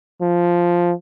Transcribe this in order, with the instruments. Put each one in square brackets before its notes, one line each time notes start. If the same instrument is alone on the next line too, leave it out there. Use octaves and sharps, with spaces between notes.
[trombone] F3